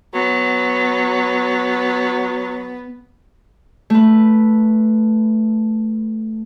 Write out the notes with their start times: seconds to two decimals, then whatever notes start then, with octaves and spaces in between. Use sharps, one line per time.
0.14 F#3 B3
3.90 A3 B4